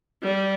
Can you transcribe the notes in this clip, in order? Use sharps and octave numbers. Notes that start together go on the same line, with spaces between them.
G3